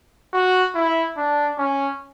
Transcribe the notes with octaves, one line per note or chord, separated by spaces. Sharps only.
F#4
E4
D4
C#4